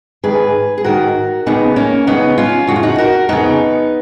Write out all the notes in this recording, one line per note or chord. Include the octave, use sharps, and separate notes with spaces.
G#2 D#3 G#4 B4
G#4
G#2 D#3 F#4 A#4
D#2 C#3 B3 D#4
A#3 C#4
D#2 C#3 B3 D#4
C#4 F4
F2 C#3 F#4
F4
D#4 F#4
F#4 A#4
F2 C#3 B3 D#4